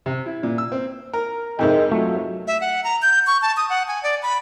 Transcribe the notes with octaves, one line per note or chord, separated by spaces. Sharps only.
C3
E4
A#2
E6
C4
A#4
F2 G#2 C3 G#3 A#4 D#5 G5
F#3 A3 F4
E5
F#5
A#5
G6
C#6
A5
D#6
F#5
G#5
D5
B5